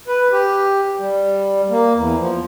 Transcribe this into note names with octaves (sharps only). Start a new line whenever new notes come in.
B4
G4
G3
A#3
E2
F3